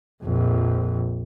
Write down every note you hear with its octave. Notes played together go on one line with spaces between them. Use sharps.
A#1 F2